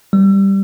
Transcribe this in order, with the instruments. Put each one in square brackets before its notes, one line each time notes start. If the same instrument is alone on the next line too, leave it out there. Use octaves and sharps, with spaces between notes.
[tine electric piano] G3